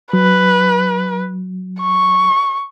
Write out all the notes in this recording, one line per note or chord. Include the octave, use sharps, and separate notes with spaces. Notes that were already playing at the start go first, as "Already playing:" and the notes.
F#3 B4
C#6